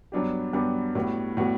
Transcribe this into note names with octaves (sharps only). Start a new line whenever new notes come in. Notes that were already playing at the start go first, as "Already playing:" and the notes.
G2 F#3 B3 D4 G4
G2 F#3 B3 D4 G4
A2 G3 B3 F#4
A2 G3 B3 F#4